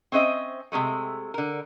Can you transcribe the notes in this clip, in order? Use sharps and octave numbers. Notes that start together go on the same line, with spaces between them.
C4 C#4 C5 D#5 E5
C3 D#3 G#3 A3
D3 A#4